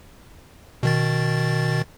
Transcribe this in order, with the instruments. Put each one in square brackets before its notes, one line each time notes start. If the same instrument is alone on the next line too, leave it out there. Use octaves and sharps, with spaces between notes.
[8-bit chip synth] B2 D#3 A6